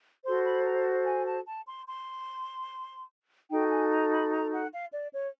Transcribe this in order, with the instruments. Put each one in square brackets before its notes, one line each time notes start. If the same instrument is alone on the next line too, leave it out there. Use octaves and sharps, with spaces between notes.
[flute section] F#4 A4 C5 C6
B5
A#5
G#5
A5
A5
C6
C6
D#4 F#4 A4 G5
G#5
A#5
B5
A#5
F#5
F5
D5
C#5